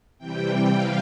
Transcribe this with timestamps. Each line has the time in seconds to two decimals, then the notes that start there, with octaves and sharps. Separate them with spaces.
0.18 C3 E3 G3 G5
0.70 F5